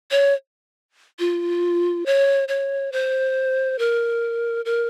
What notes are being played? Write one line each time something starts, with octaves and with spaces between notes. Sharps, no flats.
C#5
F4
C#5
C#5
C5
A#4
A#4